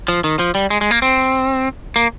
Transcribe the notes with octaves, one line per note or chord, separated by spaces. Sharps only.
F3
D#3
F3
G3
G#3
G#3
A#3
C4
A#3